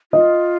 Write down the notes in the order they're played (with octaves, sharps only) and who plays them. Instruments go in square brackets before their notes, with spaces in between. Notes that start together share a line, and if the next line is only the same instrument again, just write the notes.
[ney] F4 [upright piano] D#5